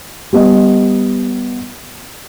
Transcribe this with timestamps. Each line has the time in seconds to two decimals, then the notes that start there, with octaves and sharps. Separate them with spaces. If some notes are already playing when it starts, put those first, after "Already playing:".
0.33 G3 B3 D#5